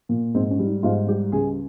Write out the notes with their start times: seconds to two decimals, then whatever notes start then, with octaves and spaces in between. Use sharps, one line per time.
0.09 A#2
0.35 G#2 C4
0.51 C#4
0.59 G3
0.67 D#4
0.83 G#2 F4
1.07 G3 G4
1.32 C#2 G#4